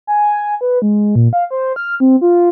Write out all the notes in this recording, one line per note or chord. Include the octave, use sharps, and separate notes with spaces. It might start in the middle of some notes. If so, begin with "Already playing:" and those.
G#5
B4
G#3
A#2
F5
C5
F6
C4
F4